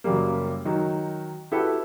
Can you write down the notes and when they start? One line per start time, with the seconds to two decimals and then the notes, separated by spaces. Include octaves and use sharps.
0.04 F#2 C#3 F#3 G3 A#3
0.65 D#3 F#3 D#4
1.52 E4 F#4 G4 A4 B4